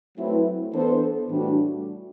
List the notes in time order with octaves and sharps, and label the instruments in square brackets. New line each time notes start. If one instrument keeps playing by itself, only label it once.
[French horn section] F#3 A3 C4 E4 B4
E3 B3 D4 A4 C5
A2 E3 G3 D4 F#4